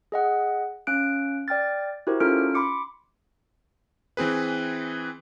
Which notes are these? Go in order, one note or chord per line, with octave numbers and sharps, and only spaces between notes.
G#4 D#5 F#5
C#4 F5 F#6 D7
D5 G5 F6 A6
E4 F#4 G4 A#4 C5
C#4 D#4 F4 A4 F6 D7
B5 C6 D6 C#7
E3 C4 G#4 B4